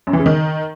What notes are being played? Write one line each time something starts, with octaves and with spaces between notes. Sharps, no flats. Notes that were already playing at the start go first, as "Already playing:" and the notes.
F#2
E3
C#3
D#3